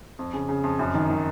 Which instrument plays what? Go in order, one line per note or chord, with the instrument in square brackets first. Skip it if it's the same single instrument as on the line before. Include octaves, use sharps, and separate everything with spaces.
[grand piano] F2
C#3
C#3
F2
F#2
D#3
D#3